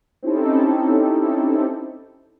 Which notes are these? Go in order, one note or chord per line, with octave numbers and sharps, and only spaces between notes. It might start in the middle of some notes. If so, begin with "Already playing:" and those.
C4 C#4 D#4 E4 G4 A4